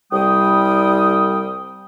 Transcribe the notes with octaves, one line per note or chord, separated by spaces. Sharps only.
C2 G3 G5 D#6